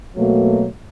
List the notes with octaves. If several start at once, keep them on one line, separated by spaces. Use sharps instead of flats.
B2 F#3 A3 A#3